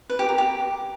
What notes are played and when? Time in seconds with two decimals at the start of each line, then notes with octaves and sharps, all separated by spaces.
0.10 B4
0.19 G4
0.29 A#4
0.38 G4